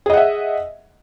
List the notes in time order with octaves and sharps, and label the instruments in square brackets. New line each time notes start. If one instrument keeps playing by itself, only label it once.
[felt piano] G#4
D#5
F#5
E5